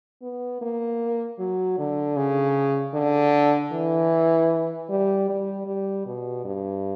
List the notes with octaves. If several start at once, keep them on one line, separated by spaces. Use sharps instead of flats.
B3
A#3
F#3
D3
C#3
D3
E3
G3
G3
G3
B2
G2